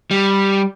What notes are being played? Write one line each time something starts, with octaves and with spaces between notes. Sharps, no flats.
G3